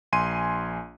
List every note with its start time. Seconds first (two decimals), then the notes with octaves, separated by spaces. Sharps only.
0.12 A#1 G#5 C6 D#7